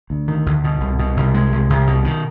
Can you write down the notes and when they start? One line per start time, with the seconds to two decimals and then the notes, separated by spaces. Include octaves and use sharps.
0.10 D2
0.28 D#3
0.46 D2
0.64 B2
0.81 C2
0.99 B2
1.17 C2
1.34 G#3
1.52 C2
1.70 C2
1.87 B2
2.05 D#3